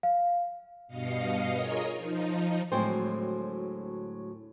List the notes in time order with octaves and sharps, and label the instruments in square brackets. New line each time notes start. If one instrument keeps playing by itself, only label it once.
[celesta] F5
[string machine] G2 B2 D#5 F5 C7 C#7
F4 G#4 A#4 C#5 D#5
F3 D#4
[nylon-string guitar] D2 A2 F#3 G#3 C4 C5